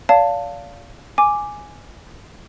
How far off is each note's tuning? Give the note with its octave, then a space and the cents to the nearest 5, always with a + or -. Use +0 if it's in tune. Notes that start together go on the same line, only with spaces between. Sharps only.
D5 -40 F5 +0 A5 +15
G#5 +0 D6 +0